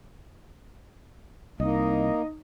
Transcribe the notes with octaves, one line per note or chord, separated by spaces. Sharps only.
C2 A#3 D#4 D#5